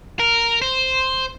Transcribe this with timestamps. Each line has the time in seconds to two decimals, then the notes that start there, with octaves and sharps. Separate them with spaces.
0.20 A#4
0.62 C5